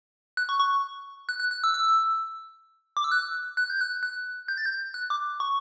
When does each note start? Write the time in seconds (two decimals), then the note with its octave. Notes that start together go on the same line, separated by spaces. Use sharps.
0.37 F#6
0.49 C#6
0.60 C#6
1.29 F#6
1.40 F#6
1.51 F#6
1.64 E6
1.74 E6
2.97 D6
3.04 E6
3.12 F#6
3.57 F#6
3.70 G6
3.81 F#6
4.03 F#6
4.48 G6
4.58 A6
4.66 G6
4.94 F#6
5.10 D6
5.40 C#6